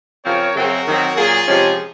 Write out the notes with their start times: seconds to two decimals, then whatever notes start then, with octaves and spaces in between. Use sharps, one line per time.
0.24 C#3 F3 C4 A#4 C#5
0.55 F#2 C#3 F#3 C4 F#4 A#4
0.86 F#2 D#3 F#3 C4
1.16 A#2 F#3 A#3 F4 G#4
1.48 C3 F3 G#3 C#4